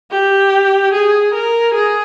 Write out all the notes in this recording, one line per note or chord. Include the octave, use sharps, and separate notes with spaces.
G4
G#4
A#4
G#4